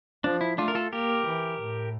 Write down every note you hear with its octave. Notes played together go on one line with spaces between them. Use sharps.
F3 D4
E4
A3 D4 F4
A#4
F4 A4
A#3 G4 A#4
E3
A2